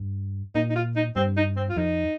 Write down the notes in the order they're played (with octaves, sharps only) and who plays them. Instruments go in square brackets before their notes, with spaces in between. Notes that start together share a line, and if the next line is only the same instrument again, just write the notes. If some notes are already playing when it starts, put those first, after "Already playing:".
Already playing: [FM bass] G2
[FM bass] A#2 [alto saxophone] D#4
[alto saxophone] D#4
F4
D#4
[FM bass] G2 [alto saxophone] C4
[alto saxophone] D#4
C4
F4
[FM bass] F2 [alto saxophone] D#4